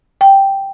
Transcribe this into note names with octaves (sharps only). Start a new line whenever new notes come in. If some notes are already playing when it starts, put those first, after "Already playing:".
G5